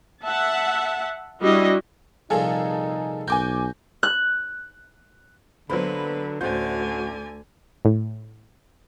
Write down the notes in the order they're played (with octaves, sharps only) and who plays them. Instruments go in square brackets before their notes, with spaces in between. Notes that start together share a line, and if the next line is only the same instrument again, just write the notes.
[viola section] E5 F#5 A5
G3 D4 E4 F#4 D#5
[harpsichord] C2 A#2 F3 [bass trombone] D#4 [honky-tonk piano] G#4 A4
[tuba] B1 [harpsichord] F#4 [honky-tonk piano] G#5 D6 G6
[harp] F#6
[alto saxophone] D3 [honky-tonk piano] F#3 B3 B5 [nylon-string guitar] A#3 C5 [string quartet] B4
[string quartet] D2 D3 G#5 [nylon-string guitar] A2 C#4 C5 [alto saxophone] F#4 [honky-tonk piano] G6
[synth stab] A2